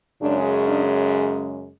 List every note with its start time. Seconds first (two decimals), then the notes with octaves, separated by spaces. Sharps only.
0.21 F#2 C#3 G#3 C#4 D4
0.68 D4